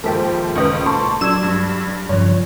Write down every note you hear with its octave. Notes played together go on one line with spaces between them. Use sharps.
D#2 G#2 F3 A4 A#4 C5 E5 G5
C#2 D#3 B4 D#5 C#6
A#2 A5 C6 C#6
F#3 D4 E6 G#6 E7
G2
G2 C#3 F3 C#5